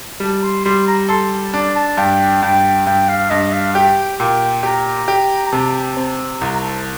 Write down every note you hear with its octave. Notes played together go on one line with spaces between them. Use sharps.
G3 A5
C6
G3 C6
A#5
A4 C6
D4
A5
G2 G5
G2 G5
G2 G5
F5
G2 D#5
F5
G4 G5
A#2 G5
G4 A#5
G4
A#5
C3 A5
C4
C2 A#5
A#5
A5